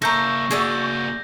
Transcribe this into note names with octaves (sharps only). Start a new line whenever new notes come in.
A#3 E4 A4 A#5 C#6 G6 A#6
A#3 F#4 G#4 D5 E5